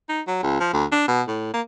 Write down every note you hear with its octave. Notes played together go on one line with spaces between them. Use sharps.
D#4
F#3
C#2
F3
D2
D4
B2
A2
A#3